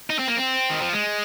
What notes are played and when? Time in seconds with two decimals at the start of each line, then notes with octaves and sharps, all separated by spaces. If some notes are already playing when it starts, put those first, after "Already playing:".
0.10 D#4
0.19 C4
0.28 A#3
0.37 C4
0.70 D#3
0.82 F3
0.93 G#3